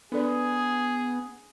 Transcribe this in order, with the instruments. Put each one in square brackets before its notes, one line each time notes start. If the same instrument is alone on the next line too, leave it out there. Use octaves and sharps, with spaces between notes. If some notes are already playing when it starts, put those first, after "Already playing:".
[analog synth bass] B3 [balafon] D4 A4 D5 [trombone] G#4